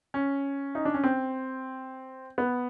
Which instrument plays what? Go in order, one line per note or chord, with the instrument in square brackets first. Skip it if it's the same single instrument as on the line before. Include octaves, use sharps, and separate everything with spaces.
[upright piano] C#4
D#4
D4
C#4
C4
B3